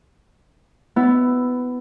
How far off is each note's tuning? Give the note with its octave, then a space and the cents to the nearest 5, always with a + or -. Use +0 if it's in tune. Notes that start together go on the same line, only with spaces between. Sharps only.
B3 +15 E4 +0